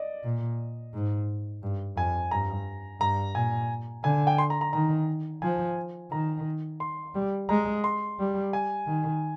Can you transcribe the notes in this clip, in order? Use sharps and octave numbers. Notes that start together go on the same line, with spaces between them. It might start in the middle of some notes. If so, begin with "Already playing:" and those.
Already playing: D5 D#5
A#2
G#2
G2
F2 G#5
G2 A#5
G2 A#5
A#2 G#5
D3 G#5
G5
C6
A#5
A#5
D#3 A#5
F3 G#5
D#3 A#5
C6
G3
G#3 A#5
C6
G3
G#5
D#3